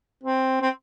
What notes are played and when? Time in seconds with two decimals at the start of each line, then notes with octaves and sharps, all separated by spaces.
0.24 C4
0.62 C4